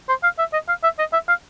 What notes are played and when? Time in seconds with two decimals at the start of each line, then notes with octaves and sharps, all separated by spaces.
0.09 C5
0.23 F5
0.39 E5
0.53 D#5
0.68 F5
0.83 E5
0.99 D#5
1.13 E5
1.28 F5